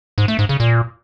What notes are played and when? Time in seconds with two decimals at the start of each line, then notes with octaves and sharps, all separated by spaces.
0.18 G#2
0.28 A3
0.39 G#2
0.49 C#3
0.60 A#2